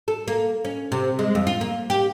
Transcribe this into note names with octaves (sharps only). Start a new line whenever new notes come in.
A4
A#3
C#4
C3
G#3
F2
F4
A#3
G4